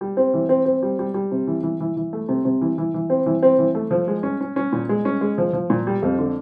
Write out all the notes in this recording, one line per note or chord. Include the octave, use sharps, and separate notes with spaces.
G3
C4
E3
C4
C4
G3
G3
G3
C3
E3
E3
E3
E3
A3
C3
C3
E3
E3
E3
C4
E3
C4
E3
A3
F3
G#3
C#4
C#4
C#4
A#2
G#3
C#4
G#3
F3
F3
A#2
G3
F2
D3